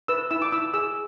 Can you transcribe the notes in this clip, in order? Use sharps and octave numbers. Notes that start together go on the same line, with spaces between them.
B4 E6
E4 E6
D6
E4 E6
G#4 E6